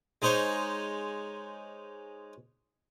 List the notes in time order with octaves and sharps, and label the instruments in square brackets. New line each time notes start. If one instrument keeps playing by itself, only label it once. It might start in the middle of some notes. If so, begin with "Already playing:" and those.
[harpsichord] G#3 D#4 C5 C#5